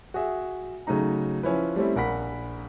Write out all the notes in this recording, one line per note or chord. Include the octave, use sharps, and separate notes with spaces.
F#4 G#4 E5
C#3 F#3 A3 D#4 A#5
F3 C#4 E4 B4
G3 A3 C4 C#4 E4
A#1 A#4 F#5 B5 B6